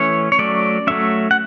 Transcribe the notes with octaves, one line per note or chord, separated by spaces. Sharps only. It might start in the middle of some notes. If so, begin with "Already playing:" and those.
Already playing: E3 A3 C#4 C#5
C#5
F#3 A3 C#4 D5
F#3 A3 C#4 E5
F#5